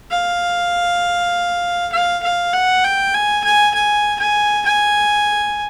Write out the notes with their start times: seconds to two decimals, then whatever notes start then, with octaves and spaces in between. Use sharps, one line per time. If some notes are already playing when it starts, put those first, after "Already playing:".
0.11 F5
1.92 F5
2.23 F5
2.53 F#5
2.84 G5
3.14 G#5
3.44 G#5
3.75 G#5
4.20 G#5
4.66 G#5